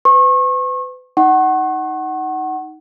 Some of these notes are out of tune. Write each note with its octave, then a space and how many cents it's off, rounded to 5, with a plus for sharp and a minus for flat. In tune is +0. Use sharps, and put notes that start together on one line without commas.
B4 +40 C#6 -35
D#4 +10 F#5 +20 C#6 -35